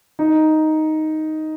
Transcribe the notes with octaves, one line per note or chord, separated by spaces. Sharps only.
D#4